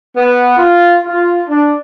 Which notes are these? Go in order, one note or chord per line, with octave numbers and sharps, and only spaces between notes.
B3
F4
F4
D4